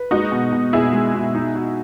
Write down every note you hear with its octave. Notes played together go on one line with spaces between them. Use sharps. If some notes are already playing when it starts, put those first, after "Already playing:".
Already playing: B4
G#3 D#4 F#4
B2
B2
B2 E4 G#4
G#3
B2
D#4
F#4